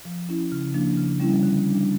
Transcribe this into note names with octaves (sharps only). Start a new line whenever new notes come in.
F3
C#4 E4
C#3
F3 A#3 D4
C#3
G3 C#4 E4
D3
G3 D4